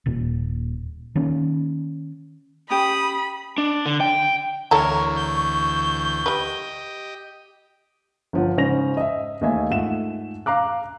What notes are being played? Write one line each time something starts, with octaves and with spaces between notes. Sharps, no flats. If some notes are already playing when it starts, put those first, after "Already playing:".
D#1 A#2
D#3 A#3 C#4
C#4 G4 B5 D#6
D4
D3
G5
D2 E3 E4 A4 A#4 C#5 A#5 C#6
G6
G3 G4 B4 D#5
G1 F3 F#5
G#2 C#3 C#4 C5 A#6 F7
D#5 E5
D#2 A3 D#5 E5 G#5
G#2 A3 F4 E5 F#5 E7
F5 A#5 D6 F#6